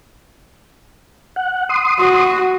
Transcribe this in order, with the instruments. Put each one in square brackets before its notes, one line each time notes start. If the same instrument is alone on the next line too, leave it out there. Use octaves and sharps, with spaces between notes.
[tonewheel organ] F#5
C6 D#6
[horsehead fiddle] F#4